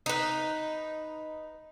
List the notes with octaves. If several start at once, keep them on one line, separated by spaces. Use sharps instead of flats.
D#4 B4